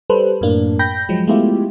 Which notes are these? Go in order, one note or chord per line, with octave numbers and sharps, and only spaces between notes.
G3 A4 B4 C5
F#2 A2 A#3 D4
G5 B5 G6 A#6
F3 F#3 G#3
G#3 A3 B3 E4 F4 G4